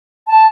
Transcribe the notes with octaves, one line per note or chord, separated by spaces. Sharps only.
A5